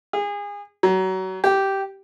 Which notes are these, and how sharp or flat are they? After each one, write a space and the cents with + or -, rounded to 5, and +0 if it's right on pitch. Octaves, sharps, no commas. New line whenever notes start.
G#4 -30
F#3 +30
G4 -10